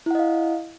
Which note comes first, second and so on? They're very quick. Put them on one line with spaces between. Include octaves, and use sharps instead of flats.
E4 F#5 D#5 F5